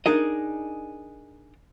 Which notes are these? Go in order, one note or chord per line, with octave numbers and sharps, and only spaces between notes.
D4 D#4 G#4 A#4 D#5